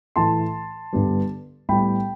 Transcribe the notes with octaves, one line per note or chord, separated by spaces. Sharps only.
A2 E3 A3 A5 C6
G2 D3 G3 B3
A2 G3 B3 G5 B5